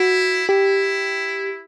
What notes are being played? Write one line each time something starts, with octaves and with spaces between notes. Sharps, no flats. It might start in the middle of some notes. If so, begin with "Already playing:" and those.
Already playing: E4 F#4
E4 G4